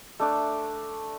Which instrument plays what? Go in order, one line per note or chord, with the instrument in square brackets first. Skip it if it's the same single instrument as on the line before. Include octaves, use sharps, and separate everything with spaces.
[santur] A3 D4 D5